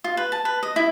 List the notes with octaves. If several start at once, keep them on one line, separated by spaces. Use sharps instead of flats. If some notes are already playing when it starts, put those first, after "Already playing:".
F4
B4
A5
B4
D#5
E4